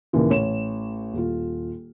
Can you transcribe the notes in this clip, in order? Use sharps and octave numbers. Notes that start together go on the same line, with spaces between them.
D#2 A#2 C#3 E3
A1 C#5 E7
D#1 F4